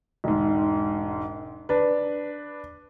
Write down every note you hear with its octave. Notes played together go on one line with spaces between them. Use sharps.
E1 G#2
D4 B4